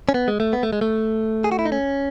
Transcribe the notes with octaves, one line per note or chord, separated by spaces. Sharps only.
C#4
B3
G#3
A3
B3
A3
G#3
A3
G#4
F#4
E4
D#4
C#4